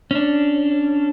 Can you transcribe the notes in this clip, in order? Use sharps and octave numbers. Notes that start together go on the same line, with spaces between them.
C#4 D4